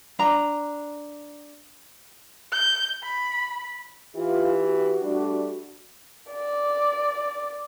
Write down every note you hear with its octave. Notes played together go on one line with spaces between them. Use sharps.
D4 A#5
G6
B5
E3 F4 G4
F#4
G3 A3 D4
D5